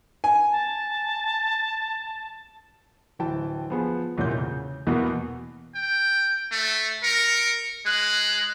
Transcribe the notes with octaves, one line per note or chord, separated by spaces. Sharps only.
G#5
A5
D1 E3 G5 A5
F3 B3 G#4
F1 E2 A#2 C#4 E4 G6
C#3
E2 B2 E3 A#3 B3
G5
A3
A#4 C#7
G#3 F#6